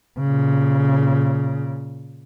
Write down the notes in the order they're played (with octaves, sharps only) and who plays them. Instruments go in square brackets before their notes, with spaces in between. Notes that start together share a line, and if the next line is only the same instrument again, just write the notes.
[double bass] A#2 C#3